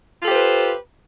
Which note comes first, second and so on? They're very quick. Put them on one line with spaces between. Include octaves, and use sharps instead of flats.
F4 A4 G4 C5 B4